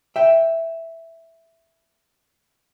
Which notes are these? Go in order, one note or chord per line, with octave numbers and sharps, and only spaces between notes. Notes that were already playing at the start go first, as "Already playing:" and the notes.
E5 G5